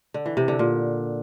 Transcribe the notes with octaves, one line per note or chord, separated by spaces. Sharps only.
D3
E3
C3
D3
A#2